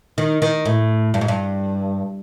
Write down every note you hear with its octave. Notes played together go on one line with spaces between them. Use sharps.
D#3
D#3
A2
G2
G#2
G2